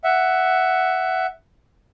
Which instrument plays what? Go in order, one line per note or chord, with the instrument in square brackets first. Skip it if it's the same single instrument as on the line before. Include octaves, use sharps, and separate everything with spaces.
[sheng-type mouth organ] E5 F#5